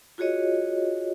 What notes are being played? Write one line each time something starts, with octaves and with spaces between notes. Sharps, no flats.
F4 F#4 G#4 C#5 D#5